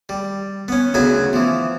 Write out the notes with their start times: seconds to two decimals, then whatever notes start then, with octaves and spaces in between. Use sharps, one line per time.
0.09 G3
0.68 B3 C#4
0.94 D2 C#3 F#3 B3 G#5 B5
1.33 E3 F3